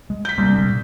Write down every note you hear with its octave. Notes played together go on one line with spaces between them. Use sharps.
G#3
G6 B6
C2 G3 A#3 C4
G1 D4
A#2